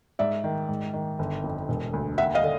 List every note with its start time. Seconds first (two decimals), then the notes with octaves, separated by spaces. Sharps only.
0.19 G#2 D5 E5
0.44 D#3
0.69 G#2
0.93 D#3
1.19 G1
1.44 F2
1.69 E1
1.93 D2
2.18 D#2 E5 F#5
2.35 D#5 F5
2.43 D3